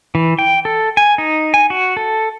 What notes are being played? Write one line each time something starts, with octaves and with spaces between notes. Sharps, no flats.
E3
G5
A4
G#5
D#4
G#5
F#4
A4